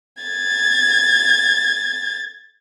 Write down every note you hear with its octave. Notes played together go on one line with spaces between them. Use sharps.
G#6 A6